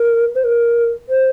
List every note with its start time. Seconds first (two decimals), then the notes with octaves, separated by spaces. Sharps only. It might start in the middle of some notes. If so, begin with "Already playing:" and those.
Already playing: A#4
0.35 C5
0.44 A#4
1.09 C5